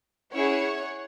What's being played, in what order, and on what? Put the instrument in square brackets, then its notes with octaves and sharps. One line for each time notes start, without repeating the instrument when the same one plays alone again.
[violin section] C#4 E4 G#4 C#5 F#5